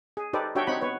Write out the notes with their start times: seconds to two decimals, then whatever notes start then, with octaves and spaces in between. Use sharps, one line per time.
0.17 G#4
0.33 D#4 G4 A4 B4 C5 D5
0.55 D4 F#4 G4 C#5 E5 G5
0.67 C4 D#4 C#5 F#5 B5
0.81 B3 B4 C#5